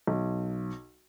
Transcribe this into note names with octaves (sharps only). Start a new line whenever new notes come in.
B1